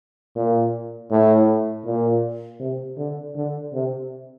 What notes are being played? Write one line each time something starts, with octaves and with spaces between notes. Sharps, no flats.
A#2
A2
A#2
C3
D3
D3
C3